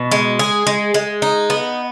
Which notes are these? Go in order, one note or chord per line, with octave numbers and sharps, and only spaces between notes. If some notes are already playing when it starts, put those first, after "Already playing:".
Already playing: B2
G#3
G#4
G#3
G#3
D#4
B3